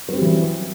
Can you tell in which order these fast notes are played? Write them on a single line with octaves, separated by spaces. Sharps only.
F#3 C4 G3 E3